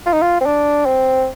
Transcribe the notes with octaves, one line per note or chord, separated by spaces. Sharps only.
F4
D#4
F4
C4
D4
C4